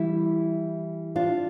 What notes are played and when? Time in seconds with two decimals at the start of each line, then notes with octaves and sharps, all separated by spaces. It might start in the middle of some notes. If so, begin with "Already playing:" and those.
Already playing: E3 G3 E4
1.16 D4 F4